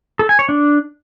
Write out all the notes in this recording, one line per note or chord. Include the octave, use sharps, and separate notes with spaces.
A4
G#5
C#5
D4